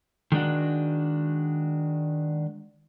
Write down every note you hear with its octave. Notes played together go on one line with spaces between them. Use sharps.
D#3 G#3 D4 F#4